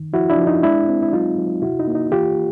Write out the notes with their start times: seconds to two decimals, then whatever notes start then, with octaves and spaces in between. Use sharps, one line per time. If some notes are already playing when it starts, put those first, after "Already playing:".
Already playing: D#3
0.13 F3 E4 F#4
0.30 D4 E4
0.38 F3
0.47 D#4
0.63 G#3 D4 E4
0.89 C4
1.02 E4
1.12 F#3 D#4 F4
1.38 F#3
1.62 C3 E4 F#4
1.79 D#4
1.87 A#3
1.95 D#4
2.11 E3 F4 G4